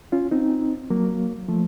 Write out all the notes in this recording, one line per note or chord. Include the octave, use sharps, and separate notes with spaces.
C#4 F4
C4 D#4
F#3 A#3
F3 A3